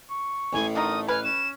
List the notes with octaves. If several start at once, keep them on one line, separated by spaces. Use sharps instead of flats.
C#6
A1 A2 G#5
D3 A3 D#4 A#4 D#6
B4 G#5 F6
C#4 E7